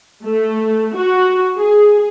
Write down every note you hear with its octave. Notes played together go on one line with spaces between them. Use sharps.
A3
F#4
G#4